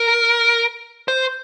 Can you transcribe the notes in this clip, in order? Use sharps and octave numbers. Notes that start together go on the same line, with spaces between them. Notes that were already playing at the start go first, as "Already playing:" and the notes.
Already playing: A#4
C5